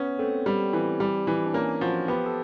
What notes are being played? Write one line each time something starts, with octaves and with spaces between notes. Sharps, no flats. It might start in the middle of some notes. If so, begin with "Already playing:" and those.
Already playing: B3 C#4
A3 C4
G3
E3
G3
E3
D4
A#3 C#4
F3 F#4
B3 G4
A4